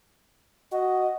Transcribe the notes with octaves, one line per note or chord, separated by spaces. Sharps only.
F#4 D#5